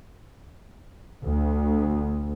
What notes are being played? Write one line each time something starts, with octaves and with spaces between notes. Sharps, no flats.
D2